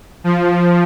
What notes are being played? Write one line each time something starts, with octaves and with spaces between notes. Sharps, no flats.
F3